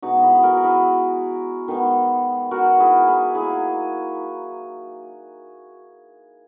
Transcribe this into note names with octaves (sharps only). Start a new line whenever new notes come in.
B2 G#3 B3 D#4 F#4
E4 G#4
G#4
F#4 A#4
A#4
E4 G#4
D#3 G#3 B3
F#4 A#4
E4 G#4
E4 G#4
D#3 F#3 A#3 E4 G#4